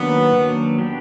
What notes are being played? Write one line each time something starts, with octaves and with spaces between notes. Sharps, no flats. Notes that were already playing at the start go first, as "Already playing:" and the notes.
Already playing: D#3 F#3 A#3 B3 D4
D#3 F#3 A#3 D4
B3 D4 G4